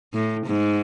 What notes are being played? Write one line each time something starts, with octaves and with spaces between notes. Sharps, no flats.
A2
G#2